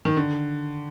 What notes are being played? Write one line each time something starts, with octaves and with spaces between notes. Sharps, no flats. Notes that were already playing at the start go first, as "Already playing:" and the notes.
D#3
D3